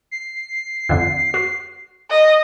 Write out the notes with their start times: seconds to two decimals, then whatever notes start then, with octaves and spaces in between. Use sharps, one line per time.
0.11 C7
0.89 F2 D3
1.34 F#4
2.10 D#5